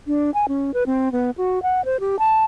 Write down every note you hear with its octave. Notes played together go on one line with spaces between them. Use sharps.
D4
G#5
C#4
B4
C4
B3
F#4
F#5
C5
G4
A5